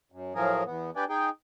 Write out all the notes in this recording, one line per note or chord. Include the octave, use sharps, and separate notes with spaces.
F#2
A2 F3 F#3 G#4 A#4
E2 B3
D4 G4 B4 D5 G5 G#5
D#4 G#4 G5